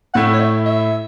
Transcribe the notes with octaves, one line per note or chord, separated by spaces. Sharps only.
A2 A3 E4 F#5
C#5
E5
E5